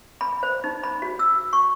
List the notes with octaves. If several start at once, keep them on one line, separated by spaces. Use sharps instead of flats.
B5
C5
D#4
B5
F#4
E6
C#6